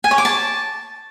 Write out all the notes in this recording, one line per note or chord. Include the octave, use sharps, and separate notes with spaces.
G#5
C#5
D6
A5